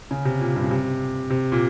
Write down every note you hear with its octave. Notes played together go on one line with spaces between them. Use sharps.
C#3
C3
A#2
G2
C#3
C3
C3
A#2